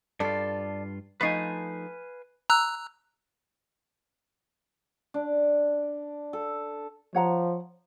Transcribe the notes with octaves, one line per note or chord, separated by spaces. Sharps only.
G2 F4 A4 D5
F3 A3 D#4 B4 F5 G#5
A#5 E6 F#6
D4
A4
F3 C#5 F#5 A#5